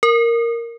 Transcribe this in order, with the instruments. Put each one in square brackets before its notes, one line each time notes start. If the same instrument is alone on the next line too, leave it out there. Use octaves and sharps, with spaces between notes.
[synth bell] A#4